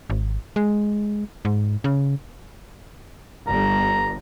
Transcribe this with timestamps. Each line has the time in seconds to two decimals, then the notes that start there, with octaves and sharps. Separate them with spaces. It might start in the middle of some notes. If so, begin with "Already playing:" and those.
0.10 G#1
0.56 G#3
1.45 G#2
1.84 C#3
3.47 G1 A#5